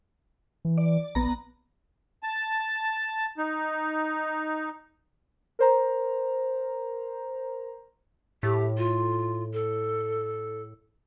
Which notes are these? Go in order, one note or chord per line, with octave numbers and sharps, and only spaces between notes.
E3
D5
A#1 B3 A#5
A5
D#4
A#4 C5 A#5
A2 G4
F4
A4